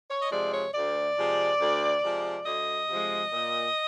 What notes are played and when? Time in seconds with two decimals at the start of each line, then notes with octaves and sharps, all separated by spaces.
0.09 C#5
0.22 D#5
0.31 C3 F3 G#3 D5
0.53 C#5
0.74 D2 D5
1.17 C3 F3 G#3
1.60 D2
2.02 C3 F3 G#3
2.45 D2 D#5
2.88 C3 F3 G#3
3.32 A#2